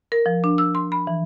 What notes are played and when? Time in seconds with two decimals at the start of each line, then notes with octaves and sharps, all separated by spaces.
0.12 A#4
0.26 F3
0.44 D4
0.58 E6
0.75 C6
0.92 B5
1.07 E3